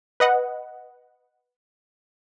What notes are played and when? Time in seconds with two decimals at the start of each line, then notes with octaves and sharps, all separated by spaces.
0.20 B4 D#5 F#5